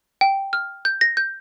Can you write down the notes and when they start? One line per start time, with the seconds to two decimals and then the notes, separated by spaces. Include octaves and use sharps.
0.21 G5
0.53 F6
0.85 G6
1.01 A#6
1.17 G6